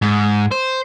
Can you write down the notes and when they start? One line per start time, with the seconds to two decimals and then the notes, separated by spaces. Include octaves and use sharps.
0.02 G#2
0.51 C5